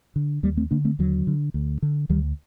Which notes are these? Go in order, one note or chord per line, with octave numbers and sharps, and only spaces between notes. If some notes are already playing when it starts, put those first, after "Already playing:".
D3
D#2 G3 A#3
A3 C4
D3 A#3 D4
A3 C4
D#2 D3 F#3
D3
D2
D3
D2 D#3 G3